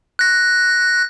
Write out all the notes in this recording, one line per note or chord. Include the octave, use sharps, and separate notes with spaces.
F#6 A#6